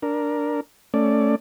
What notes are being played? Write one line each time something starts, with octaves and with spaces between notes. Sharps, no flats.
D4 A#4
A3 C#4 D5